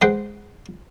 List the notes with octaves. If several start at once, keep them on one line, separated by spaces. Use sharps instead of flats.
G#3 B4 C5 F#5 G5